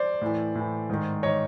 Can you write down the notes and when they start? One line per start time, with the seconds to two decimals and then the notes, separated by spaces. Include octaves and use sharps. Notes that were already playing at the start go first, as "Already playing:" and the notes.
Already playing: C5 D5
0.21 A2 E3
0.55 A2 E3
0.89 G#2 D#3
1.23 D#3 C#5 D#5